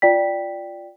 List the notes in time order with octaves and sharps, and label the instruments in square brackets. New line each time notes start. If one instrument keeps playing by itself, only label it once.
[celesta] F4 D5 G5 B6